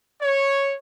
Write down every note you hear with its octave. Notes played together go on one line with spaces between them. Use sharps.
C#5